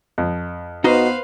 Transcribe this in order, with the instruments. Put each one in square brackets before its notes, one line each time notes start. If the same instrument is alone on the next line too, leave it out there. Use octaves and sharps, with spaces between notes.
[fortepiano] F2
[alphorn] B3 [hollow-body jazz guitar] D#4 F#4 D#5 [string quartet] B4 C5 F5